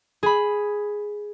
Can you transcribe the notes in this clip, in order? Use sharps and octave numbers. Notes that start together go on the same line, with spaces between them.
G#4 B5